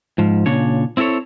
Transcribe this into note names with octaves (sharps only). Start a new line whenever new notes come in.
G#2 F3
A#2 C#3 D4 C#5
C4 E4 F4 A4 C#5